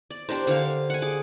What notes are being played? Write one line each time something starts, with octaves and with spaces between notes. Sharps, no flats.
D5
D4 G4 A#4 C5
D3 C5 F5
F#5 G#5
G#4 D6